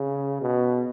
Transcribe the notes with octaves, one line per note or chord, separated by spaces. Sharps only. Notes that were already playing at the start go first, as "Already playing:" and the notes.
Already playing: C#3
B2